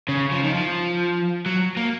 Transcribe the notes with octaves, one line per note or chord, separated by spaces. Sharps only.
C#3
F3
D#3
F3
F#3
A#3